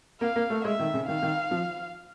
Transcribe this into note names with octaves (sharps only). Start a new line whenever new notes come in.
A#3 F5
A#3
A3
G#3 E5
D#3
C#3
D#3 F5
D#3
F3